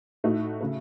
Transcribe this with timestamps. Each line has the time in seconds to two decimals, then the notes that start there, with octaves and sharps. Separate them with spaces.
0.24 A2 A3 D#4 F#4
0.61 C#3 A3